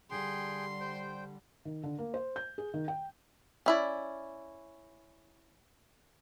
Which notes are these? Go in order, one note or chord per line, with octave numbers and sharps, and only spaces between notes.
D3 G3 G#4 G5 C6
C5 G5
D#3
D3
A#3
C5
G6
G#4
D#3
G5
C#4 E4 D5